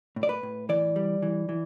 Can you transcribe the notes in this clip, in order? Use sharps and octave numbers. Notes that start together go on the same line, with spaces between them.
A2
D5
B4
A2
E3 D5
G3
E3
E3